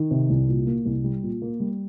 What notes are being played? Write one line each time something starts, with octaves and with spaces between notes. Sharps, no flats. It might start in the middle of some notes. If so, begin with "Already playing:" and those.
Already playing: D#3
C3
C2
A#2
A#3
C2
G3
A#2
A#3
G3